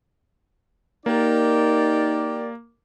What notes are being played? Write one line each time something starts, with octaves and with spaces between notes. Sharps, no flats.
A#3 D#4 G4 A#4 D5